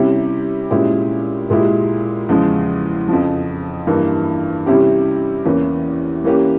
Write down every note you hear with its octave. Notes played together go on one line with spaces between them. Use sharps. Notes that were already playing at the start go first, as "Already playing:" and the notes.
Already playing: C3 G3 C#4 E4 G4
A#2 G#3 C#4 E4 G4
A#2 G#3 E4 G4
E2 C#3 F3 G#3
F2 C#3 F3
G2 E3 A#3
C3 G3 C#4 E4 G4
E2 E3 A#3 C#4
E3 A#3 C#4 G4